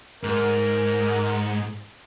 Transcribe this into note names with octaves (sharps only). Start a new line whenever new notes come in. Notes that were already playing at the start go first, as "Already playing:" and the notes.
G#2 A#4